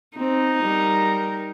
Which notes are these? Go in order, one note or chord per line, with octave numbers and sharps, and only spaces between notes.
C4 D#4
G3 A#4